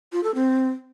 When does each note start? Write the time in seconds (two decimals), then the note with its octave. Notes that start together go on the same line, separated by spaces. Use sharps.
0.12 F4
0.24 A4
0.35 C4